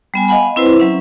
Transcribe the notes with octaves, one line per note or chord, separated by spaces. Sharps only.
G3 B3 G#5
D#5 F5 F#5 G#5 B5
C4 E4 B4 C5
F#3 C#4 E5